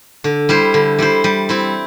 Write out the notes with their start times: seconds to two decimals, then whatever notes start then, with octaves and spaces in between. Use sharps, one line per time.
0.24 D3
0.49 G3 E4 C5
0.74 D3
0.99 G3 E4 C5
1.24 G3
1.49 C4 E4